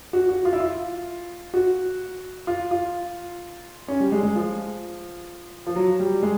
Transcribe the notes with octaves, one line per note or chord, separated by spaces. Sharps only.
F#4
F#4
F4
E4
F4
F#4
F4
F4
C#4
G3
G#3
G#3
F3
F3
F#3
G3
G#3